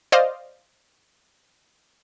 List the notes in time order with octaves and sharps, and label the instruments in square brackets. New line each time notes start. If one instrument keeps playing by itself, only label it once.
[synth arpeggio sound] C5 D5 D#5 F5